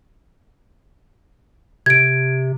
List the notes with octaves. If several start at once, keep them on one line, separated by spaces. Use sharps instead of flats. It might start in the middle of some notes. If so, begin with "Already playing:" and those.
C3 G#6 D7